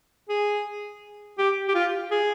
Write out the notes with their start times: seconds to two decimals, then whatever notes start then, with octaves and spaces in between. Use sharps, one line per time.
0.29 G#4
1.38 G4
1.69 G4
1.75 F4
2.11 G#4